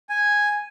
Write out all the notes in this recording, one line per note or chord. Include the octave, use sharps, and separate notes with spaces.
G#5